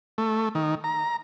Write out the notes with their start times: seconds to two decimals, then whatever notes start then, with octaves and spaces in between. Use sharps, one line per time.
0.18 A3
0.55 D#3
0.84 A#5